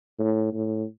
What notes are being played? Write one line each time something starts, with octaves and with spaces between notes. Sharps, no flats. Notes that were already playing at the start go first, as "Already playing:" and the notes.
A2
A2